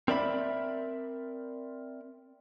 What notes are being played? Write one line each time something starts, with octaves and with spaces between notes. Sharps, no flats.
C4 A#4 D5 E5 B5